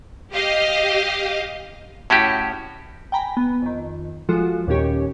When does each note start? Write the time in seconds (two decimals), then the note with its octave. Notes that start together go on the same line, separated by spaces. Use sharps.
0.34 G4 D#5 F5
2.10 A2 C#4 E4 F#4 G4
3.12 G5 G#5 A#5 B5
3.37 B3
3.62 F2 D#3
4.29 F3 G#3 F4 F#4 A4
4.67 D#2 A#2 D#3 C#4 G4 C#5